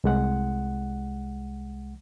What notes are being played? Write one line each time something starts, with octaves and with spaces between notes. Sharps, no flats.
C2 G#3 F#5